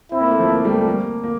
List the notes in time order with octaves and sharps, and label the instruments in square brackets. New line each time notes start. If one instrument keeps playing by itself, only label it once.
[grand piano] C4 [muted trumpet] E4
[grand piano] A#3
A3
F3
A#3
A3
G3
A3
A#3
A#3